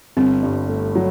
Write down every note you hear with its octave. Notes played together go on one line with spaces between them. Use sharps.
G1 C4
G2
A3
F#3